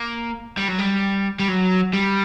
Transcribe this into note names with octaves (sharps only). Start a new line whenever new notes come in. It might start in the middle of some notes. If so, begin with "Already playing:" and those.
Already playing: A#3
G3
F#3
G3
G3
F#3
G3